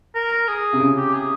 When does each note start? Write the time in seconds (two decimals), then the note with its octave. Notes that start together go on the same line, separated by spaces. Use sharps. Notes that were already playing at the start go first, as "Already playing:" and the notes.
0.15 A#4
0.48 G#4
0.73 C3
0.80 C#3
0.97 G4
1.13 G#4